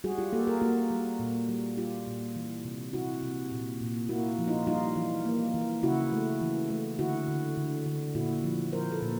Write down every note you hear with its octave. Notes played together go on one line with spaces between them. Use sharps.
G3 F#4 G#4
F4 G4
A#3 G4 A4
G#4 A#4
A#3 F#4 G#4
G3
A#2
G3
G3 F4 G4
A#2
E3
C3
C3 E4 F#4
C3
A#2
A#2
A#3 E4 F#4
F3
D#4 F4
G3 D#4 F4
E3
A#3
E3
C#3 E4 F#4
A3
E3
A3
D3 E4 F#4
D3
D3
D3
A#2 E4 F#4
F3
F3 A#4 C5
A4 B4
A#2